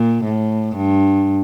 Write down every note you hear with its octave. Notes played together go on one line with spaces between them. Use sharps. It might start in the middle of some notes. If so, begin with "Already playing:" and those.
Already playing: A#2
A2
G2